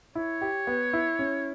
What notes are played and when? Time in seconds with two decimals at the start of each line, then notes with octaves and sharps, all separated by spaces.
0.15 E4 C#5
0.41 G4
0.67 B3
0.93 E4
1.19 C#4